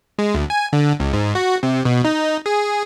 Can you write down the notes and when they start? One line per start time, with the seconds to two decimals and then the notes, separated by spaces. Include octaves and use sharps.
0.19 G#3
0.34 D2
0.50 G#5
0.73 D3
1.00 C#2
1.13 G#2
1.35 F#4
1.63 C3
1.85 B2
2.05 D#4
2.46 G#4